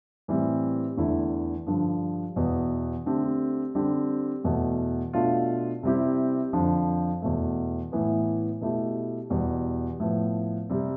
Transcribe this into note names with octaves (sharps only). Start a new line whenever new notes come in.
A2 E3 G3 C4
E2 D3 A3 E4
G2 D3 F3
E2 B2 B3
D3 A3 C4 G4
D3 G3 C4 G4
E2 B2 A3
B2 A3 D4 F4
C3 G3 C4 E4 G4
F2 D3 F3
E2 B2 A3
A2 E3 B3
B2 A3 E4 G4
E2 B2 G3
A2 F3 B3
C3 G3 C4